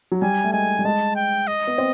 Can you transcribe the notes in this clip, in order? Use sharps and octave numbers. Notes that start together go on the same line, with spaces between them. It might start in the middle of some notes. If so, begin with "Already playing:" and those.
F#3
G3 G#5
A3
G#3 G#5
G3
G#3 A5
G5
D#5
B3
C4